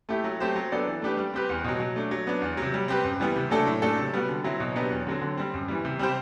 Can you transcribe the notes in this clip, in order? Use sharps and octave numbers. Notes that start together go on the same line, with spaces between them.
A3 E4 G4
F#3
A3 C4 G4 C5
F#3
B3 D4 A4 D5
E3
A3 D4 G4 B4
G3
C4 G4 B4
E2
B2 F#3
F#3
A3 D4
F#3
B3 D4
E2
C3 F#3
G3
C4 G4 B4
F#2
E3 G3 B3
C3
F#3 A3 D4 A4
A2
F#3 A3 D4 A4
C3
G3 B3 F#4
D3
F#3 C4 E4
B2
F#3 B3 D4 G4
E2
D3 F#3 C4
D3
G3 C4
F#2
E3 G3
C3
G3 C4 G4 C5